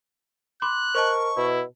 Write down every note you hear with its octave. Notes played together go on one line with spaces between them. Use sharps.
B5 C6 D6 F#6
A#4 C5 D#5 A5 C#6
B2 E4